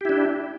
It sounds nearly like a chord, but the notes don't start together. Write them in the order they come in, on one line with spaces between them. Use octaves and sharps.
G4 E4 D4